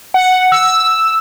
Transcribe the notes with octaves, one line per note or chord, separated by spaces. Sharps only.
F#5
E6